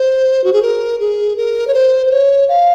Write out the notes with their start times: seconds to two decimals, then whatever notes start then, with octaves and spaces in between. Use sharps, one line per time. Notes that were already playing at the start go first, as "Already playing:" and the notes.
Already playing: C5
0.44 F#4
0.53 G#4
0.63 A#4
1.00 G#4
1.37 A#4
1.67 C#5
1.74 C5
2.06 C5
2.11 C#5
2.49 F5